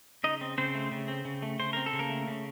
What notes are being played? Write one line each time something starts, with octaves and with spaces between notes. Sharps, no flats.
C#3 D#4 D#5
C4
C#3 C4 C5
A3
C#3
C4
C#3
A3
C#3 C5
C4 A#4
A4
C#3
A#3 A#4
A3
C#3